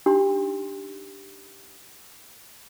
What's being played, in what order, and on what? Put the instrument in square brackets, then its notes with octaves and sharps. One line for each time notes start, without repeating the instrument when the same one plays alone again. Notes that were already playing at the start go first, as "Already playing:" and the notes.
[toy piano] D4 D#4 G4 C6